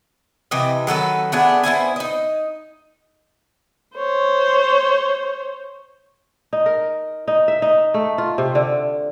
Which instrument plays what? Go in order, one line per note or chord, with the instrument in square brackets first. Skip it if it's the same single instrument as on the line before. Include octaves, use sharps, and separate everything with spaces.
[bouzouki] C3 E3 G4 D#5
D#3 F#3 A4 B4
A3 B3 D4 G#4
B3 E4 C5 G#5
D#4 D#5
[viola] C5 C#5
[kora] D#4
A#4
D#4
E5
D#4
A3
F4
C3
D3